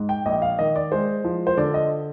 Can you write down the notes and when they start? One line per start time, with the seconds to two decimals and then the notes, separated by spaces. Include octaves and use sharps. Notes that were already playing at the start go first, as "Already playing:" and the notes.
Already playing: G#2
0.09 G5
0.26 A#1 D#5
0.42 F5
0.59 D#3 D#5
0.76 D5
0.92 G#3 C5
1.24 F3
1.47 C5
1.57 D3 D5
1.74 D#5